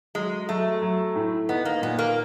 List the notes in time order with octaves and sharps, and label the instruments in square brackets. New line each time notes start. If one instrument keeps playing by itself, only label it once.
[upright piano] F#3 [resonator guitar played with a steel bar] G#3
[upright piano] F#3 [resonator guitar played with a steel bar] A3
[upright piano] F#3
A2
[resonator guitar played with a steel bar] B3 [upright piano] D#4
[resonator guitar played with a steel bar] A#3
[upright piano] A#2 [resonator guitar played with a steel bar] B3
[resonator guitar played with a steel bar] A#3